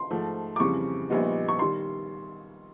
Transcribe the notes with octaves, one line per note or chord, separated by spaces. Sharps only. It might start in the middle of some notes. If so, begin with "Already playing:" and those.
Already playing: C6
G#2 F3 A3
D6
F2 C#3 E3 G3 C4 C#6
A#1 A#2 G3 B3 D#4
C#6
D#3 G3 C6